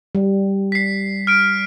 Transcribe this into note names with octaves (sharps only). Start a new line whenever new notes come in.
G3
B6 C7
F6 D7